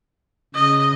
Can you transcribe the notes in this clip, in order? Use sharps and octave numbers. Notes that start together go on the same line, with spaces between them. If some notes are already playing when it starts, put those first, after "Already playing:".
C#3 D#5